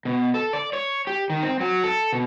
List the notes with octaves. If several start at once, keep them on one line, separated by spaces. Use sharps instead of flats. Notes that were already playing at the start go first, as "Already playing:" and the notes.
B2
A4
D5
C#5
G4
D#3
C4
F#3
A4
B2